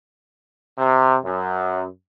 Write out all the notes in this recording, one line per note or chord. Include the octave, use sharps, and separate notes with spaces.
C3
F#2